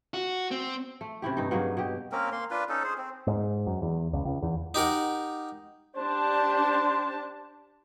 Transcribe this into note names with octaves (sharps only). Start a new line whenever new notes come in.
F#4
C4
A3
C3 C#4 E4 G4
G2 D#4
G2 F#3 A#3 G#4
B2 G4
A#3 C4 C#4 A#4
A#3 C6
D4 F4 B4
C#4 D#4 A4
G#4 C5
C4
G#2
F#2
E2
C#2
C#2
E2
D#4 G4 A#4 F#5
D4 G4 C5 A5